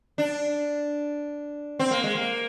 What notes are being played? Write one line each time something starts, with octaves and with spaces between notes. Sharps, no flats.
D4
C4
A#3
G#3
A#3